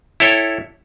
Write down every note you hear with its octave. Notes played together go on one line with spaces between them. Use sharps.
E4 A4 C#5 G5